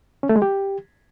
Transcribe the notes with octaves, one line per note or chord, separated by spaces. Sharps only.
C#4
A3
G#3
G4